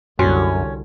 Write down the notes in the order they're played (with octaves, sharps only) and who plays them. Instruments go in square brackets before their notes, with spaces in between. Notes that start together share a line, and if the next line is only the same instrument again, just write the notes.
[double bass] C2 D3 [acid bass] F#2 [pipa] C#4 [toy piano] F#4